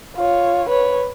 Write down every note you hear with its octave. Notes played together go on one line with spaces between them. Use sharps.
F4 C#5
B4 C#5